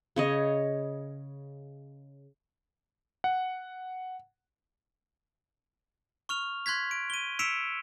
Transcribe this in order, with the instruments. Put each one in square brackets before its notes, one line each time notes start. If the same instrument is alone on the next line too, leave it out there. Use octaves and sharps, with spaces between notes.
[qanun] C#3 C#5 D#5
[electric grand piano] F#5
[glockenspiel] C#6 F6 F7
C6 F#6 G#6 B6
D7
D#7 G7
E6 B6 C#7 D7 E7 F7